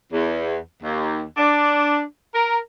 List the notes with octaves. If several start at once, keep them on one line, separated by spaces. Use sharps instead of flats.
E2
D#2
D4
A#4